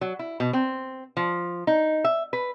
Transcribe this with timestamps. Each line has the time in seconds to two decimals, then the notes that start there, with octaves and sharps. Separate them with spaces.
0.01 F#3
0.19 E4
0.40 B2
0.53 C4
1.17 F3
1.67 D#4
2.04 E5
2.33 B4